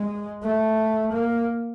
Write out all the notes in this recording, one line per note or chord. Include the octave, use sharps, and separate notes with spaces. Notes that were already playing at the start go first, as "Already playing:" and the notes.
Already playing: G#3
A3
A#3